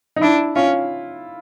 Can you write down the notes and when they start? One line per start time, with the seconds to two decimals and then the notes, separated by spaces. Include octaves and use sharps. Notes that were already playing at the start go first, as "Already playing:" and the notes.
0.16 D#4
0.22 D4 E4
0.56 C#4 F4